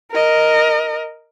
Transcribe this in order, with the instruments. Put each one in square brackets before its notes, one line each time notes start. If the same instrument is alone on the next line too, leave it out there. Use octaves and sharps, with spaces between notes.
[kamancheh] A#4 D#5